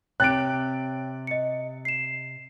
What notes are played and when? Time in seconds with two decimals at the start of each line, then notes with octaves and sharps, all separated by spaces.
0.20 C3 C4 G4 C#5 G5 F#6 A6 D7
1.27 D#5 C#7
1.85 C7 E7